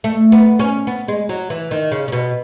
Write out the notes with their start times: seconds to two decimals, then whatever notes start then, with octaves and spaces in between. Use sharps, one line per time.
0.04 A3
0.32 B3
0.59 C#4
0.87 B3
1.08 G#3
1.29 F#3
1.50 E3
1.71 D#3
1.92 C#3
2.08 C#3
2.12 B2